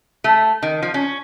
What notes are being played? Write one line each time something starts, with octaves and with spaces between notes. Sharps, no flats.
A3
D#3
F3
C#4